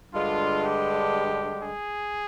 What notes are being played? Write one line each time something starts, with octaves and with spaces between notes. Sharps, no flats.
G2 D3 G#3 F4
G4
G#4